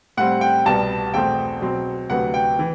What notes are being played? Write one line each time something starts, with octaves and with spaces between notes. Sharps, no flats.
A2 G3 C4 F#5
G5
C2 B2 G3 B3 A5
E2 B2 A3 C4 G5
B2 F#3 C4
D2 C3 F#3 B3 F#5
G5
E3